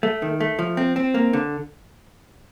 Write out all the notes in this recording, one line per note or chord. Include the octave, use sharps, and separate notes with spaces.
A3
D#3
A3
F3
C4
C4
A#3
D3